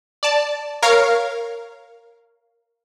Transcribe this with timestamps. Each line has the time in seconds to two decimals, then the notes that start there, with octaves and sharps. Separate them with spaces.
0.23 D5 A5
0.83 A#4 C#5 F5